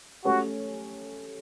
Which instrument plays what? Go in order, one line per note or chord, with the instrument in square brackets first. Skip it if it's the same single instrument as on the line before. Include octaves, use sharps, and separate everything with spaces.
[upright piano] A3 C#4 G4 C#5 [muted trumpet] F#4